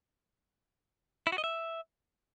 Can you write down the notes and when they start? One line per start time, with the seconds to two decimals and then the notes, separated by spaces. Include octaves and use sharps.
1.27 E4
1.32 F#4
1.38 D#5
1.44 E5